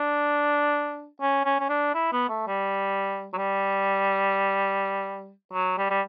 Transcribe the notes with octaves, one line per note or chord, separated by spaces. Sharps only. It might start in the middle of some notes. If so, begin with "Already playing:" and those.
Already playing: D4
C#4
C#4
C#4
D4
E4
B3
A3
G3
F#3
G3
F#3
G3
G3